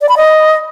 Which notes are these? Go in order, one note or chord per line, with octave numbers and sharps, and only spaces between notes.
D5
B5
D#5